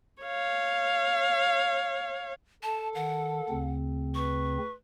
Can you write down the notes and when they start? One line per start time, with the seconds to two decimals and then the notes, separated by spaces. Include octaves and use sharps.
0.22 C#5 F5
2.63 A4 A5
2.95 D#3 F#5
3.49 D2 C#3 C4
4.15 B4 C#6